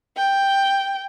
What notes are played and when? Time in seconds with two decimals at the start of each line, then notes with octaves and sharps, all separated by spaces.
0.17 G5